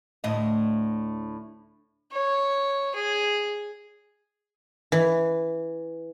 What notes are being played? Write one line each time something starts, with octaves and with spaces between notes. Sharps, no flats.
D2 A2 D#5
C#5
G#4
E3